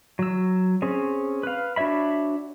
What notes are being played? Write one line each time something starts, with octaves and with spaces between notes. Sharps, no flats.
F#3 E6
C4 C#4 G#4
B4 F5
D4 F#4 C#5 E5 B5